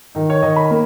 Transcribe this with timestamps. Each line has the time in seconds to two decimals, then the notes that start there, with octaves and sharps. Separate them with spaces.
0.15 D#3 D#4
0.30 C#5
0.42 D#3 D#5
0.56 B5
0.71 A#3